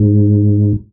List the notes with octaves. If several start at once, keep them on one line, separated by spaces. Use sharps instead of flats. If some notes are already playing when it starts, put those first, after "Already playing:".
Already playing: G#2